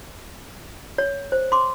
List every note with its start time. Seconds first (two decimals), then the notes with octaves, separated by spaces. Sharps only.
0.98 C#5
1.32 C5
1.52 C6 D6